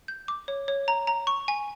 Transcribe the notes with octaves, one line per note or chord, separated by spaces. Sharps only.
G6
D6
C#5
C#5
A#5
A#5
C#6
G#5